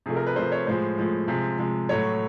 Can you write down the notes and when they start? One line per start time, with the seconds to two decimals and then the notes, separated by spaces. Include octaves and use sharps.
0.06 C3 F3 A3 G#4
0.16 A#4
0.26 B4
0.36 C3 F3 A3 C5
0.52 C#5
0.67 A2 F3 G#3 C5
0.98 A2 F3 G#3
1.28 C3 F3 G#3
1.58 C3 F3 G#3
1.89 A2 F#3 A3 C#5